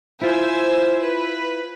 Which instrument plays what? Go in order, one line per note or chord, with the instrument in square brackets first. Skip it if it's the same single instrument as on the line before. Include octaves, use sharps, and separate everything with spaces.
[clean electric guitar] E4 F4 [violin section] C5 G#5 E6
[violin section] B4